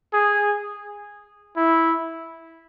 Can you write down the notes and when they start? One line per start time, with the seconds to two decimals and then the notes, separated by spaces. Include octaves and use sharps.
0.14 G#4
1.56 E4